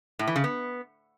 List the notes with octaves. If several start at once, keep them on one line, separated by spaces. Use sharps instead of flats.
A2
E3
C#3
B3